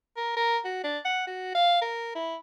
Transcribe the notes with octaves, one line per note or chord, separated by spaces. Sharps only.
A#4
A#4
F#4
D4
F#5
F#4
F5
A#4
E4